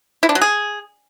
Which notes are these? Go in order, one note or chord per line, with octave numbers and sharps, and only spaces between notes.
E4
D4
F#3
G#4